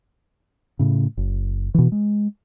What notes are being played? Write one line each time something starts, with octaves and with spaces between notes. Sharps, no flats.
A2 C#3
F#1
B2 E3
G#3